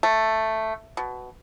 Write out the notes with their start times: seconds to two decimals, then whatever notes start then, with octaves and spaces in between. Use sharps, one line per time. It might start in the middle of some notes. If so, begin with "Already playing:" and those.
0.03 A3
0.97 B2